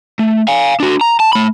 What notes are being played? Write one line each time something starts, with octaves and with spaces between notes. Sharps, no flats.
A3
F5 G#5
D4 F#4
A#5
A5
A3 B5